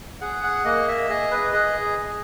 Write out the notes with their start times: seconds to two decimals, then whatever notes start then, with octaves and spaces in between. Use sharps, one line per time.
0.21 G#4 F#5
0.44 F#5
0.65 A#3 D#5
0.88 E5
1.09 G#4 D#5
1.31 B4
1.53 G#4 D#5